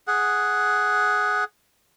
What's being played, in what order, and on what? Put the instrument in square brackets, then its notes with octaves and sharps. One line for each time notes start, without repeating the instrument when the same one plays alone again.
[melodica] G#4 F#5